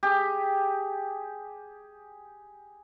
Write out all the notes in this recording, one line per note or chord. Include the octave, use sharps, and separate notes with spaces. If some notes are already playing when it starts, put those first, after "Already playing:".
G4 G#4